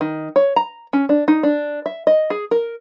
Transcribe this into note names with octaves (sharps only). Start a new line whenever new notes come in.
D#3
C#5
A#5
C#4
D4
D#4
D4
E5
D#5
G#4
A#4